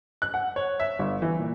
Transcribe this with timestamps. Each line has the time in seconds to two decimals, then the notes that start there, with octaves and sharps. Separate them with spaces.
0.22 F#6
0.34 F#5
0.56 C#5
0.80 E5
0.99 G1
1.22 E3
1.39 A#2